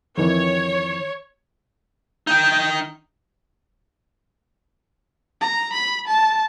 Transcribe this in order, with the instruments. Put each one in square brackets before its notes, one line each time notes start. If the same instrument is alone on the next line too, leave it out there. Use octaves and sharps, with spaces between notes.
[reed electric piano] F2 D#3 E3 [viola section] C#5
[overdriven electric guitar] D#4 G5
[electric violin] A#5
B5
A5